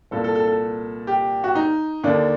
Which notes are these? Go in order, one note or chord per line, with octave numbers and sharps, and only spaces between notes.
C2 A#2 A4
A4
A4
A4
G4
F#4
D#4
D#2 D3 D4